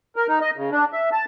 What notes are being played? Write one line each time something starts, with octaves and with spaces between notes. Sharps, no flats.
A#4
D#4
D#5
C#3
D4
E5
A5